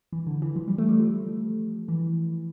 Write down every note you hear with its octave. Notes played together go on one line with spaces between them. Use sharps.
E3
D3
E3
F3
G3
A3
G3
F3
E3